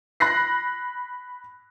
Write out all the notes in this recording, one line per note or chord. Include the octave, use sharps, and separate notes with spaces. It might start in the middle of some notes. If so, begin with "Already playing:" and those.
B5 F#6 A#6 C7